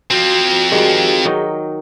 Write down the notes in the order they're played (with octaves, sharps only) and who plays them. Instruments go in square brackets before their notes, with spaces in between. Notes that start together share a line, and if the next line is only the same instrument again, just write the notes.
[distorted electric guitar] F3 C4 [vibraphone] F#4
[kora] D#3 G3 G#3 [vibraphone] F#4 G#4
[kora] D#3 F#3 D#4